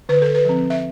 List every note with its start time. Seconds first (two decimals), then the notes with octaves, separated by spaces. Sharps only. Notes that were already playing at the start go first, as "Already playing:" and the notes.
0.09 D3 B4
0.22 A4
0.35 B4
0.45 F3 C4
0.70 E5